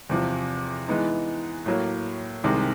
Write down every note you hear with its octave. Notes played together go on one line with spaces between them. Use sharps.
E2 C3 F3
E3 G#3 B3 D#4
A2 F#3 A#3
C2 C3 D#3 G#3